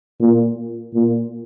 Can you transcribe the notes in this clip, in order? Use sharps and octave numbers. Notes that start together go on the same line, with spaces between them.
A#2
A#2